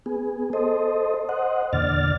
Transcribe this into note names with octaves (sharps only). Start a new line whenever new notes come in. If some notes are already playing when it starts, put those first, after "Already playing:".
B3 G#4
A4 C5 D#5
C5 D#5 F#5
E2 A#2 D3 D5 F6 A6